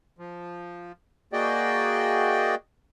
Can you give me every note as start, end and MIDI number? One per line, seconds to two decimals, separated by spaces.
0.19 0.92 53
1.33 2.55 58
1.33 2.55 66
1.33 2.55 68
1.33 2.55 74
1.33 2.55 75
1.33 2.55 79